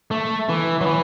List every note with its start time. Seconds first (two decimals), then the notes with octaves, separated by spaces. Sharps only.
0.11 A3
0.49 E3
0.81 F#3
0.86 E3